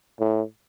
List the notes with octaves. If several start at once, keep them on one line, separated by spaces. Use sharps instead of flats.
A2